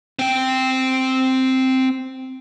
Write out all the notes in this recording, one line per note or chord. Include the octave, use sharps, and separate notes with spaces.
C4 G5